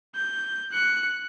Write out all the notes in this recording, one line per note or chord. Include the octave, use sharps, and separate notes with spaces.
G6
F#6 C#7